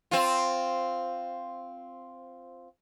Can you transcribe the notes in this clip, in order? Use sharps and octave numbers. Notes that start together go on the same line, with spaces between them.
C4 F4